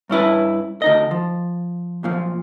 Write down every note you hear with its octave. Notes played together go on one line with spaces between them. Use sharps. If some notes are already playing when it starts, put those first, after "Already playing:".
G2 C#4 E4 B4
D2 D#4 D#5
F3
F#2 A#2 F3